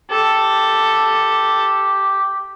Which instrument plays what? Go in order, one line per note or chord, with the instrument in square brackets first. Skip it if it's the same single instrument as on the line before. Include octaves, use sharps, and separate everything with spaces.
[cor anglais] G4 [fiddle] A4